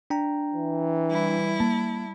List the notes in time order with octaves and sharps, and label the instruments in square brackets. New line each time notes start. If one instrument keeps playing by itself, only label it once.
[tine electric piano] D4 G5 A#5
[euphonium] E3
[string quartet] G3 E4
[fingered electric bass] A#3 [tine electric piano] A5